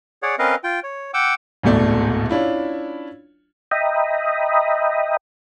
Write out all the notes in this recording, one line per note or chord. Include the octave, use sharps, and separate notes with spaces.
G#4 C#5 D5 F#5
C4 C#4 A#4 B4 D#5 F5
F4 G5
C#5
F#5 G5 D6 E6
D1 A#1 G#2 B2 A3 D5
C#4 D4 E4 F4
D#5 E5 G5 A#5 B5 D#6